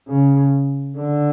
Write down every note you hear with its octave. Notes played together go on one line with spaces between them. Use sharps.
C#3
D3